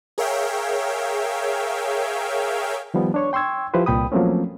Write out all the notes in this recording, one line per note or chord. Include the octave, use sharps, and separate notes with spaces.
G#4 A#4 C#5 E5 F5 G5
D#3 F3 G3 B3
D4 C#5 C#6
G5 C6 C#6 E6 G#6
F3 E4 G4 B4 C5
C2 A#2 G5 B5 D#6
F3 F#3 A3 A#3 C4 C#4